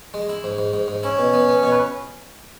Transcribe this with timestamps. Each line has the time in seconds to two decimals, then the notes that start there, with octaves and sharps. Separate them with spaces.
0.14 G#3
0.29 E4
0.44 G#2
0.58 G#2
0.73 G#2
0.88 G#2
1.03 C#4 E4
1.19 B2
1.33 B3
1.49 B3
1.63 B2 C#5
1.71 B4